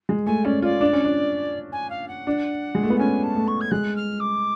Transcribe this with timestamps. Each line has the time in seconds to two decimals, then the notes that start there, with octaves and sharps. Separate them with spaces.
0.09 G#3
0.26 A3 G#5
0.45 C#4 D5
0.62 F4 D5
0.81 D4
0.93 C#4
1.05 D4
1.72 G#5
1.90 F5
2.08 F#5
2.27 D4
2.75 G#3
2.83 A3
2.90 B3
2.99 C#4 G#5
3.23 A5
3.35 A3
3.47 C#6
3.61 G#6
3.71 G#3 F#6
3.96 F6
4.20 D6